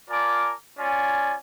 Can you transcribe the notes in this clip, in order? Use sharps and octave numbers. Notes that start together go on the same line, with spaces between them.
F4 A#4 D5 G#5 A5 D6
C#4 F4 D5 G#5